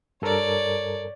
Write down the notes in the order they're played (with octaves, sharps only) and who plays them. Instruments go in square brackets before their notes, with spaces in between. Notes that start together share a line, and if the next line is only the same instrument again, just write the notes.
[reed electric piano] G2 A4 A#4 [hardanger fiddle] C#5 D5